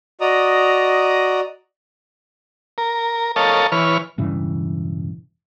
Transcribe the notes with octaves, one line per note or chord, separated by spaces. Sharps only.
F#4 D5 D#5 A#5 D#6
A#4
A4 A#4 C#5 D#5 F5 A5
E3 B4 C#5 F6
E1 G2 C#3 E3